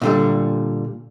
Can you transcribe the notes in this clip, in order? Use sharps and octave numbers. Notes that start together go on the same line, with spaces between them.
A#2 D3 G3